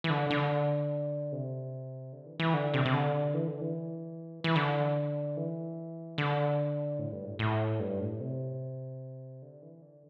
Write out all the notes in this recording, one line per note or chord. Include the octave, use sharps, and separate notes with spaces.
E3
D3
D3
C3
D3
E3
E3
D3
C3
C3
D3
E3
D3
E3
E3
D3
E3
D3
A2
G2
A2
A2
G2
A2
C3
D3
E3
D3